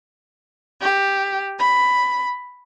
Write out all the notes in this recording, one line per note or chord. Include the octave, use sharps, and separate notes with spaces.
G4
B5